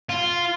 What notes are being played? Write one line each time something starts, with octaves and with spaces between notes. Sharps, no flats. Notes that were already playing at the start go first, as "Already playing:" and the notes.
F4